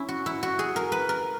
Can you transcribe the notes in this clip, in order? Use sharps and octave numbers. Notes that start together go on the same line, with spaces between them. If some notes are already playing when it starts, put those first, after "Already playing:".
Already playing: C#4 E4
F#4
E4
F#4
G#4
A#4
B4
A#4